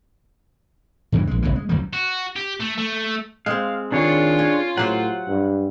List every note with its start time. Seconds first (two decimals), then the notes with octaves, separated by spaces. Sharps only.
1.12 E2 G2 C#3 E3
1.27 A#1 G#3
1.42 F1 C#2 C#3 E3
1.56 G#3
1.69 C2 F2 F#3 G3
1.93 F#4
2.37 G4
2.60 A3
2.78 A3
3.46 G#3 C4 F5
3.92 D#3 D4 F4 G#4 C#5
4.39 C#4
4.77 A2 F#3 G4 C5 F#5
5.27 G2